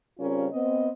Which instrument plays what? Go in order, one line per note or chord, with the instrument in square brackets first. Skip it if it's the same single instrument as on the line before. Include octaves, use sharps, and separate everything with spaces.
[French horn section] C#3 G3 C4 C#4 F4 A#4
B3 C4 D#5